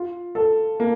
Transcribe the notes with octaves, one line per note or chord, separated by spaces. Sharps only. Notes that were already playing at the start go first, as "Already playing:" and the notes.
Already playing: F4
A4
A#3